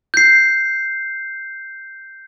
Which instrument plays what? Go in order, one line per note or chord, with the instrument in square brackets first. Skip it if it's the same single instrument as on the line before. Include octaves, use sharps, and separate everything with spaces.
[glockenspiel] G6 C7